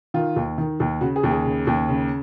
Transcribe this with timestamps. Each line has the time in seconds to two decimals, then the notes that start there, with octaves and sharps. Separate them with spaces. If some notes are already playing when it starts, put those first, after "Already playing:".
0.14 D#3 F4
0.36 D#2
0.58 D#3
0.80 D#2
1.01 C#3 F#4
1.16 G#4
1.23 D#2
1.31 G#4
1.45 C#3
1.67 D#2
1.89 C#3